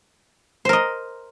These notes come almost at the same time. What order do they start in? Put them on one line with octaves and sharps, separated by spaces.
C5 A#4 D#5